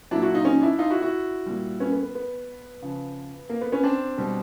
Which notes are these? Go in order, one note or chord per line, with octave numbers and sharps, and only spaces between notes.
A#2 F#3 D4 E4
E4 F#4
D#4 F4
C#4 D#4
D4 E4
D#4 F4
E4 F#4
E4 F#4
A#2 G3
B3 C#4
B3
B3
B3
C#3 F3
A#3
B3
B3 C#4
C4 D4
B2 G3